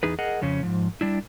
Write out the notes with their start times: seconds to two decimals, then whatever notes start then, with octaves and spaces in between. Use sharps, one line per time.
0.03 E2 D#4 G#4 B4
0.19 G#4 A#4 D#5 F#5
0.42 F2 C#3 C#4
0.63 G#2 F3
1.01 G3 D4 E4